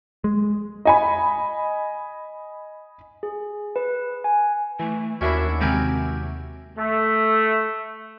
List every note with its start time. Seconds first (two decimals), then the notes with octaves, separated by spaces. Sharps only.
0.24 G#3
0.85 D#5 G#5 B5
3.23 G#4
3.76 B4
4.24 G#5
4.79 E3 A3
5.21 D#2 C#4 D4 E4 F#4 A#4 E5
5.61 C3 D#3 G#3 C4 G4 A#4 G#5
6.77 A3